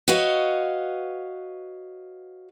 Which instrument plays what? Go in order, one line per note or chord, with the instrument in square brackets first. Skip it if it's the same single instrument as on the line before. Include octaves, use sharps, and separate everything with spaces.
[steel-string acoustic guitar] F#4 B4 C#5 D#5 F5